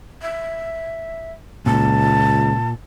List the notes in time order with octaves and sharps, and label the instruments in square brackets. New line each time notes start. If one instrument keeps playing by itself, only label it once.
[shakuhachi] E5
[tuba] C#2 [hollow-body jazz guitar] A#2 [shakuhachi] A5